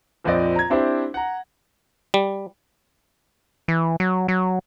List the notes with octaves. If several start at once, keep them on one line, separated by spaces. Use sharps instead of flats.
A#1 F2 C4 D5 D#5
A#5 G#6
C4 D4 E4 G4 C5
F#5 A#5
G3
E3
F#3
F#3